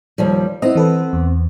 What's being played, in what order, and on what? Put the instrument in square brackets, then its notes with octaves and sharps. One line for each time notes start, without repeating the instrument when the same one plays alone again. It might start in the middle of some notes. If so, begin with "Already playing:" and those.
[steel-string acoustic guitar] D#2 F3 G3
[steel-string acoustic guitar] B3 C4 [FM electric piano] E4 D#5
[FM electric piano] E3 A4 B4
E2